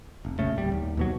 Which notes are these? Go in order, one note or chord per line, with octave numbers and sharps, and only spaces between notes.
F1
A#1 C#3 A3
D1 G3
D#2
D#2 B2 F#3